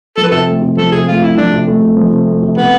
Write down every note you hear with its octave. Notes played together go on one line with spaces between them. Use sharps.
F3 A4
B4
C3 A4
A3
C3
F3 A4
C3 G#4
A3 F4
C3 E4
F3 D4
C3
A3
C3
F3
C3
A3
C3
C3 B3